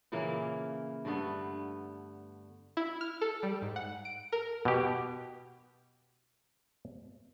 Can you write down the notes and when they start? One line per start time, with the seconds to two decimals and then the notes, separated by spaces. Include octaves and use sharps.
0.12 A#2 C#3 E3 A#3
1.05 G2 D3 A3 B3
2.77 E4
3.01 F6
3.21 A4
3.43 G3
3.62 G#2
3.76 F#5
4.05 D7
4.32 A#4
4.65 B2 G4